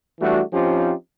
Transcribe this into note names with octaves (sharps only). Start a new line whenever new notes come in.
E3 G3 A3 D4 F#4
F3 C4 C#4 D#4 F4 G4